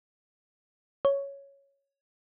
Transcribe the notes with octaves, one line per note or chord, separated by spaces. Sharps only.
C#5